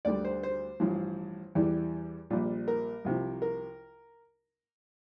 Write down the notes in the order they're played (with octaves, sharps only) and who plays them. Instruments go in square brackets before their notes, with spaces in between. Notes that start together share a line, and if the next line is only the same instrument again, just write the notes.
[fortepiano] D2 D3 G3 D5
C5
C5
A1 G2 F3
E2 E3 G3
A#1 A#2 G3
A#4
C2 C3 F3
A#4